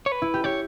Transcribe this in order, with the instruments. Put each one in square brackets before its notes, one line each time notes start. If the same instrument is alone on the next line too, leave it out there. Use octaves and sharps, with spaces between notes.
[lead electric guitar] C#5
B4
[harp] E4
G4
[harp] G4 [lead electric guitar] C#5